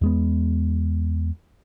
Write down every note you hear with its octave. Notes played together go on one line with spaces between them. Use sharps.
E2 G#3 B3